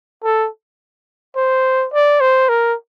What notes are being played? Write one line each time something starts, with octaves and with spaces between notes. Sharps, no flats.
A4
C5
D5
C5
A#4